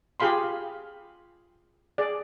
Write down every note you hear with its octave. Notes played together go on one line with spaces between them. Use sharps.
F4 G4 G#4 F5 B5 C6
G#4 D5